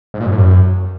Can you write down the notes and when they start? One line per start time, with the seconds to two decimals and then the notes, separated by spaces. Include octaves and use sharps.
0.14 G#2
0.20 A#2
0.26 F#2
0.32 A2
0.38 F#2